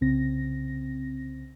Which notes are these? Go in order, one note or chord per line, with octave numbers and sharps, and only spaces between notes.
C2 C#3 C4 A#6